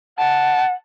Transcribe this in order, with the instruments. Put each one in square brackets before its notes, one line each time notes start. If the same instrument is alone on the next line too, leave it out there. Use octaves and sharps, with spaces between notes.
[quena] F#5 [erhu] A5